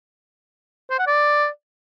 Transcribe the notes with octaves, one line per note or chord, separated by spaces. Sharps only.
C5
F#5
D5